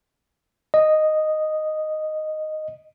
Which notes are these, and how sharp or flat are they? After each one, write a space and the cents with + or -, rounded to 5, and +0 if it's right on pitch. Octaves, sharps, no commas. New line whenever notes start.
D#5 -5